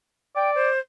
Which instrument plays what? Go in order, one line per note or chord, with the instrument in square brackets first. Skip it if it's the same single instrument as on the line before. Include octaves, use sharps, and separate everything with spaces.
[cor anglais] D5 [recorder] G5
[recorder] C5